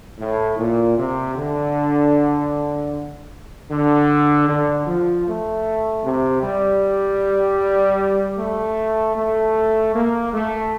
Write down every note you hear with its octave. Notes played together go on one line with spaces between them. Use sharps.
A2
A#2
C3
D3
D3
D3
F3
A3
C3
G3
A3
A3
A#3
A3